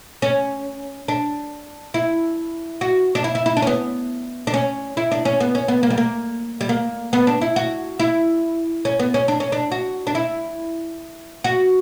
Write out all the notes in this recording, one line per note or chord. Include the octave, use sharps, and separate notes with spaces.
C#4
D4
E4
F#4
D4
E4
E4
E4
D4
C#4
B3
D4
C#4
E4
D4
C#4
B3
C#4
B3
A#3
G3
A#3
G3
A#3
B3
D4
E4
F#4
E4
C#4
B3
C#4
D4
C#4
D4
F#4
D4
E4
F#4